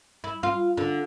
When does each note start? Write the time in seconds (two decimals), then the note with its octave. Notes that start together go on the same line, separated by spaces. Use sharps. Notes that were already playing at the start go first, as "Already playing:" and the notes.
0.24 E4
0.43 F4
0.77 D3